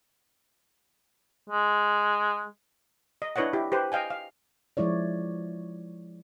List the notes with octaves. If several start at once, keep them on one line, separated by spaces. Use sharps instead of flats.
G#3
D#5
D4 E4 B4 C#5 D#5 F#5
E4 G4
G4 B4 C5
D#5 F5 G5 G#5
F5
F3 G#3 E4 C#5 D5